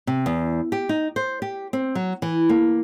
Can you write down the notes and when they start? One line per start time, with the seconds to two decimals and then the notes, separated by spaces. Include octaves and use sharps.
0.07 C3
0.26 E2
0.72 G4
0.89 D#4
1.16 C5
1.42 G4
1.73 C4
1.95 F#3
2.22 E3
2.49 A#3